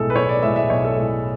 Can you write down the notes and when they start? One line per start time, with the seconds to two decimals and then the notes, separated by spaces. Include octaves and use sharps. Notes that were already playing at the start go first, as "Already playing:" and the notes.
Already playing: B1 A2 G#3 A4
0.10 B4
0.15 B1 C#5
0.29 D5
0.42 A2 G#3 E5
0.56 E5
0.70 B1 C#5
0.85 A4
0.98 A2 G#3